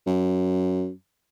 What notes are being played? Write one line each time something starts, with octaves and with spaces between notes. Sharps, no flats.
F#2